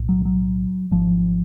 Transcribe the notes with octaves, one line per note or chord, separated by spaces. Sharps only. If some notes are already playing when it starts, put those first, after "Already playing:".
Already playing: B1 A2
F#3
F#3
G#1 G#2 F3